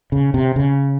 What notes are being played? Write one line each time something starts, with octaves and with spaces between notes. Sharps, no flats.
C#3
C3
C#3